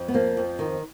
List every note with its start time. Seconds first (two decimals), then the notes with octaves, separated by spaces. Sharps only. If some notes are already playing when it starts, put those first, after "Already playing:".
Already playing: F2
0.08 B3
0.14 F3 A#3
0.37 F2
0.59 D#3